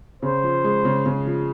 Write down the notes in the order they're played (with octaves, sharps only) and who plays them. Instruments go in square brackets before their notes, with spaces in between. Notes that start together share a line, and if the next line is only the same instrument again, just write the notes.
[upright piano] C#3 [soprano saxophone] C5
[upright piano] F3
G#3
C#3
C#3
F3